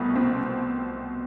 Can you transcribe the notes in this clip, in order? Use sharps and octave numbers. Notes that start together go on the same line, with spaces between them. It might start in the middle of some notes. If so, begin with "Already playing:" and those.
Already playing: C2 B2 A3 B3
C4